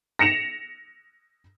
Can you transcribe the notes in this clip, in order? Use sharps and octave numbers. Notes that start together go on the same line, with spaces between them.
A#6 C#7 E7 F7